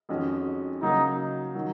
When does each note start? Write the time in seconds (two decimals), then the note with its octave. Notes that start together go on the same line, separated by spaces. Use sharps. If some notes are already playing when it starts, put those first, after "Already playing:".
0.09 F2 D#3 G#3 C#4 F#4
0.82 C#3 F#3 A#3 D#4
1.55 D#3 F#3